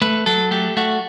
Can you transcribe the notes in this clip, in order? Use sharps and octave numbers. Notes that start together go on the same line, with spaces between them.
A3 B4
F#3 A4
A3 G4
A3 F#4